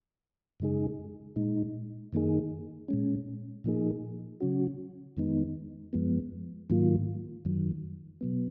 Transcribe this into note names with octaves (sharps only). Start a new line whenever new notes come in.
F#2 C#3 G#3 D#4 G#4
A#2 G#3 D#4
F#2 D#3 A#3 D#4 G#4
A#2 G#3 C#4
A#2 F3 A#3 D#4 G#4
C#3 F#3 C#4 F#4
F2 D#3 G#3 B3 D#4
F#2 F3 G#3 B3
G#2 D#3 F#3 A#3 F4
F#2 D#3 F#3
B2 F#3 B3